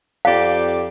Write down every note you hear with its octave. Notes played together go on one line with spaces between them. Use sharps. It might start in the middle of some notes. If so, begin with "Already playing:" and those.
F2 G4 D5 F5